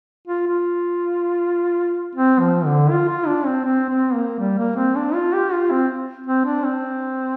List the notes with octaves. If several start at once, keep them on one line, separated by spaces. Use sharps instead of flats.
F4
F4
C4
F3
D3
F4
F4
D4
C4
C4
C4
A#3
G3
A#3
C4
D4
F4
G4
F4
C4
C4
D4
C4